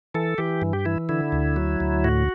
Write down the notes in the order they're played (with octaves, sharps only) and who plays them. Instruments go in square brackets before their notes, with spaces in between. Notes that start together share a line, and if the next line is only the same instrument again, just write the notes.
[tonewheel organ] E3 A4
E3 G4
G2
G4
E3 E4
D3 E4
D2
F#3
D2
A2 F#4